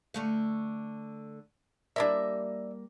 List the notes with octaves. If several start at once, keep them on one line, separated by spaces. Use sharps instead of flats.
D3 A3 F5
G3 A#3 D4 E4 E5